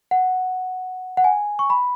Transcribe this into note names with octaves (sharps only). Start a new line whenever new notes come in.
F#5
F#5
G#5
C#6
B5